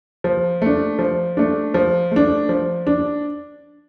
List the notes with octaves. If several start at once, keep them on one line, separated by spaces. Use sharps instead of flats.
F3
A3 D4
F3
A3 D4
F3
A3 D4
F3
D4